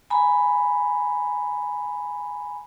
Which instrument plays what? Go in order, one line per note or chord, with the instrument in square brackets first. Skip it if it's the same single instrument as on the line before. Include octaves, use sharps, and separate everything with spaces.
[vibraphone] G#5 A#5 B5